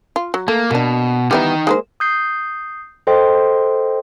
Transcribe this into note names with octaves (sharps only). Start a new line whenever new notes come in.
F4
F#3
A3 A#3
B2 A#3 D4
G3 B3 D#4 E4 G5
G#3 A#3 C5
D#6 G6 C7
A4 C5 D#5 G5 C6